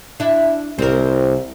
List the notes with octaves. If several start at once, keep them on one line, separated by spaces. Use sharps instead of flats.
D4 E4
C2 C4 A#4